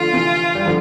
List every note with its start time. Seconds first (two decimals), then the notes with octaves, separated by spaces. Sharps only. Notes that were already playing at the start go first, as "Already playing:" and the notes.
Already playing: D3 F3 A3 F4
0.12 C3 E3
0.55 G3
0.65 D3 F3